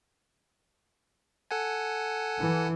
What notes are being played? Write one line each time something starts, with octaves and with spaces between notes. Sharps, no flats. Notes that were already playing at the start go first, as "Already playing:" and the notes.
A4 F#5 G#5
E3